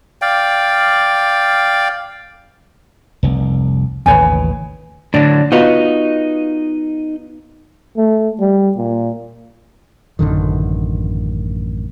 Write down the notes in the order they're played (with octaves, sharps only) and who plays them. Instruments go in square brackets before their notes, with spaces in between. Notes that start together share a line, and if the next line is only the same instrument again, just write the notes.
[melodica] D5 F5 G5
[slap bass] F1 C2
[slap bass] A1 D#2 C#3 [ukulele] B4 C#5 G#5
[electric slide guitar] A2 D3 F#3 [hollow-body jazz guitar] D4
[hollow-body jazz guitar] B3 F4 F#4 [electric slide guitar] D#4 D#5
[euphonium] A3
G3
A#2
[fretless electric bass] A1 F#2 D3 D#3